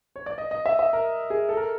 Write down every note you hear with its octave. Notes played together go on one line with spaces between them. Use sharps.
C#5
D5
D#5
D#5
E5
E5
A#4
G#4
A4
A#4